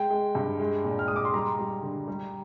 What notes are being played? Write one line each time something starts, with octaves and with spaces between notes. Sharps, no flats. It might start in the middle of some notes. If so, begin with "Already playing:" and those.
Already playing: G#3 G5
G#3
G2
G#3
A#2
F6
G#3 D#6
D6
C6
G3 A#5
G3
D3
G3